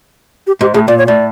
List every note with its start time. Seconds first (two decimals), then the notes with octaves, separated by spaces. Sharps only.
0.47 G4
0.61 G#2 G4
0.74 A2 G#4
0.88 A#2 D5
0.98 C#5
1.06 A2 D5